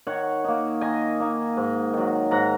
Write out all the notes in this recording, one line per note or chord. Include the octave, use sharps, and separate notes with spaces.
D#3 C#5 F#5
A#3 D#4
D#3 D#5 G#5
A#3 D#4
G#2
D#3 F#3
G#2 F#5 A#5